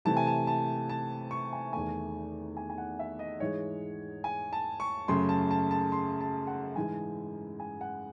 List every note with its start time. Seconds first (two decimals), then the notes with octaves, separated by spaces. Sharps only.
0.05 C3 E3 A3 A5
0.17 G#5
0.27 A5
0.47 A5
0.89 A5
1.31 C#6
1.53 G#5
1.73 E2 D#3 A3 G#5
2.57 G#5
2.70 G#5
2.78 F#5
2.99 E5
3.19 D#5
3.40 G#2 E3 G#3 C#5
4.24 G#5
4.53 A5
4.80 C#6
5.08 F#2 C#3 F#3 A3 C6
5.29 A5
5.51 A5
5.71 A5
5.92 C6
6.20 A5
6.47 F#5
6.76 G#2 E3 G#3 G#5
7.60 G#5
7.81 F#5